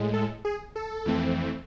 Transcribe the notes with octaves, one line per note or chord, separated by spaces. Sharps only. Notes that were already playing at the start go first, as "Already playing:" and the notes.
Already playing: A2 G#3
A4
G#4
A4
F2 E3 A3 C4